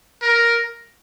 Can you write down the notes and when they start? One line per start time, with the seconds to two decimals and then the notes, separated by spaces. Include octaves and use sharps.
0.22 A#4